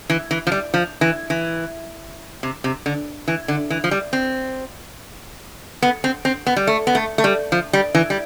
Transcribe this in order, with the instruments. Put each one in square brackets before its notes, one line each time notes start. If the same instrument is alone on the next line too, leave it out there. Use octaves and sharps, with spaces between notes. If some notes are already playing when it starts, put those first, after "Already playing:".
[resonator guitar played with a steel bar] E3
E3
F3
G3
F3
E3
E3
C3
C3
D3
E3
D3
E3
F3
G3
C4
B3
C4
C4
B3
G3
A3
B3
A3
A3
G3
F3
G3
E3
G3